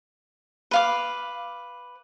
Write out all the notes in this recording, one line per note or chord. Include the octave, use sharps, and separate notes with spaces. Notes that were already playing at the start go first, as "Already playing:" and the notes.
B4 F5 D6